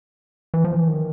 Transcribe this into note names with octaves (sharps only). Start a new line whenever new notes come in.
E3
F3
E3
D#3